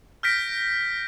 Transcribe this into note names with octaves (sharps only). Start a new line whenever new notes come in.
F6 G6 A#6 B6 D7